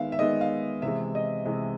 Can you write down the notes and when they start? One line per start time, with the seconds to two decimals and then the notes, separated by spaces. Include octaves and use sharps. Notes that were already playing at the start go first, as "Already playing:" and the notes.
Already playing: D#3 G#3 B3 E5 F5
0.12 E5
0.19 D#3 G#3 B3 D#5
0.41 F5
0.82 C3 E3 G#3 E5
1.15 D#5
1.45 C3 E3 G#3